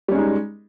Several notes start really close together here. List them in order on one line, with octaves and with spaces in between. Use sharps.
G3 C#4 G#3 D#4